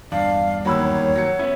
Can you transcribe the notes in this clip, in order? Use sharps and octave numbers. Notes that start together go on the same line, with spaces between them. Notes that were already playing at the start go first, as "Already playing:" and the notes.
E2 G2 D4 F5
D#2 F#3 C#5 B5 E6
F#3 C#7
B3 C#4 E4